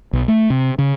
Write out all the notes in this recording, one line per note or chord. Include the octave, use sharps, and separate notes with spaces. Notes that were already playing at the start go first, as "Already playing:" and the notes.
B1
A3
C3
C#3